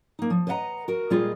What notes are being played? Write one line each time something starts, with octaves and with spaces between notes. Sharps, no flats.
A#3 D#4
F3
B4 C5 D#5 E5 F#5 A#5
F#4 A#4
A#2 G3 G#3 F4 G#4 D#5